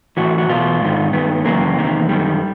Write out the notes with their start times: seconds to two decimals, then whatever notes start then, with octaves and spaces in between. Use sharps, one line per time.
0.17 A2 E3 F#4
0.38 F#4
0.49 E2 B2 F4
0.81 G#2 D#3
1.13 G2 D#3 B3
1.45 F#2 C#3 E3 A#3
1.78 E2 C3 D#3
2.09 F#2 D#3 G3